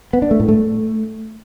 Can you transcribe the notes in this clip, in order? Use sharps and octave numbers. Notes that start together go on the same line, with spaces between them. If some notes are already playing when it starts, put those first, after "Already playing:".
B3
D4
A3
A2
A3